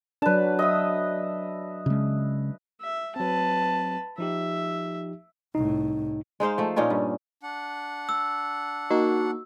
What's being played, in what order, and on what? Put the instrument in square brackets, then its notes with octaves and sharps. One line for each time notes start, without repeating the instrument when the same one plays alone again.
[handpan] F#3 D4 [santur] B4 A5
[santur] D#5 E5 D#6
[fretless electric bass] C#3 G#3
[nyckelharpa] E5
[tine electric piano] F#3 C4 [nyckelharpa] B4 A5
[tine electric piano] F3 D#4 G4 [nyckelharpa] E5
[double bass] C2 A2 [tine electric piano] D#4
[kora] G#3 D#4 C5 F5
F3 A3
A#2 C#4 D#4 F4
G2
[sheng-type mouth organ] D4 F#5
[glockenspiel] E6
[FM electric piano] A#3 D#4 A#4 [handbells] F#4